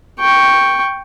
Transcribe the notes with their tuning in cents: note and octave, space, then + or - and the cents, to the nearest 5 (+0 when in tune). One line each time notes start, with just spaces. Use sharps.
G5 +0 C#6 +0